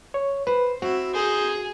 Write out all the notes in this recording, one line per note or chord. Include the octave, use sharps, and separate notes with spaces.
C#5
B4 C5
C4 E4 F#4
D#4 G#4 C5 D#6